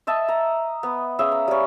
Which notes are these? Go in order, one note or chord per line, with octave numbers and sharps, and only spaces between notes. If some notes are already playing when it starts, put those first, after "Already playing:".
D#5 E5 A5
A#5
B3
C#4 G#4 E5 F5
A#5
G3 C#4